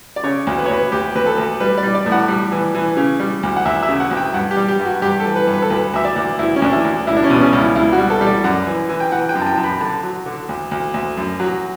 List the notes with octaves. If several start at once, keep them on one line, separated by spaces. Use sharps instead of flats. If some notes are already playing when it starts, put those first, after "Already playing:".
D5
C#3 C#5
D2
B4
C#5
D2 B4
D2 G4
D2 B4
A4
D2
G3 B4
D5
G3
D5
A2
F#5
G3
E3
E3
C#3
G3
D2
F#5
D2 E5
E5
C#3
F#5
D2
G5
G2 F#5
G4
G3
G4
G2
F#4
G2 G4
A4
E3
B4
G2
B4
A4
D2 B4
D2 E5
D5
D2
D2 E4
C#4
D2 D4
E4
D2
C#2 E4
D4
C#4
B2
C#4
C#2
E4
C#2 E4
F#4
G3
A4
G3
D5
F#2 F#5
E3
E3
G5
E3 F#5
G5
F#2
A5
G5
F#2
B5
D3 A5
F#3
D3
D2
D2
D2
F#2
F#3